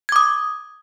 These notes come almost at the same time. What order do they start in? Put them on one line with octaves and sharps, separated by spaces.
G#6 D6 D#6